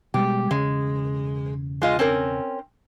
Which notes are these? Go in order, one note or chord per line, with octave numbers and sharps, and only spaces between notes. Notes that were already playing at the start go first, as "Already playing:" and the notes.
B2 G3 G#3 G4
E1 C#3 G#3
G#3 F4 D#5
C4 C#4 A#4